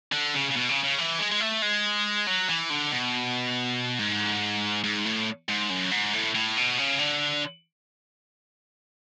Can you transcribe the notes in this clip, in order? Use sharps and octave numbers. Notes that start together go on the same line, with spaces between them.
D3
C#3
C#3
B2
C#3
C#3
E3
G#3
G#3
A3
G#3
F#3
E3
D3
B2
G#2
G#2
A2
G#2
F#2
G#2
A2
A2
B2
C#3
D3